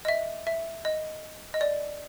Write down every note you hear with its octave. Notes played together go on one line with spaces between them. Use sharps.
D#5
E5
E5
D#5
D#5
D5